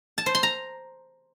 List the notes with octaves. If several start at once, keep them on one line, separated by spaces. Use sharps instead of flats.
A5
C5
C6
A#5